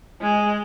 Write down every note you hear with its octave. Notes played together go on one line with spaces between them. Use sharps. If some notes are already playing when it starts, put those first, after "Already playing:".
G#3